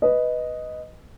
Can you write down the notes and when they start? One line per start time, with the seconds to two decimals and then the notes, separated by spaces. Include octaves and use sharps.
0.02 B4 D#5